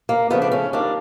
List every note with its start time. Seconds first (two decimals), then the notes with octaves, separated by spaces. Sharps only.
0.09 A#3
0.30 C#3 F3 A3 B3
0.42 D4
0.52 C#4
0.73 D#3 G3 A#3 D4